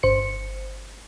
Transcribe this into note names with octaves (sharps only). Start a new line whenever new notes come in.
G1 C5 C#7